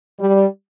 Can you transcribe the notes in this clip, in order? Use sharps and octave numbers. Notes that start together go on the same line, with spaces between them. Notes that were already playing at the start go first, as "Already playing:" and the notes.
G3